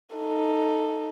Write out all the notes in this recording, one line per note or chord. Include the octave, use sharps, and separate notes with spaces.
D#4 A4